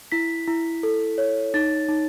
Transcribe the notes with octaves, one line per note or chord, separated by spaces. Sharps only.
E4 B6
E4
A4
C#5
D#4 A6
D#4